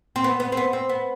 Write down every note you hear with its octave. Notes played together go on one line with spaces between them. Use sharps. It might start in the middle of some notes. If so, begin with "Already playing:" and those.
C4
B3
B3
C4
B3
C4
B3